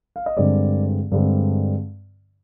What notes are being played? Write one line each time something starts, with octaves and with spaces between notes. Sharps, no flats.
F5
D#5
G2 D3 G#3 C4 D5
G2 D3 G#3 C4